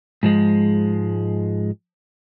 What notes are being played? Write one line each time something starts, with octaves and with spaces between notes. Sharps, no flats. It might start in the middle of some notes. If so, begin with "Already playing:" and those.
G#2 F3 G#3